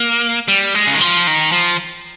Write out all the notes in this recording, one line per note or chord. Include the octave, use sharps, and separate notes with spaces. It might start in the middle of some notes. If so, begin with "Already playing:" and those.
Already playing: A#3
G3
G#3
C#3
D#3
F3
D#3
F3